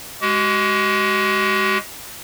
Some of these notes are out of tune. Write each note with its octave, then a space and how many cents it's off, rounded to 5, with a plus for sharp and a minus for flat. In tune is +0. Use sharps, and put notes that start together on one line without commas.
G#3 +0 F#4 +45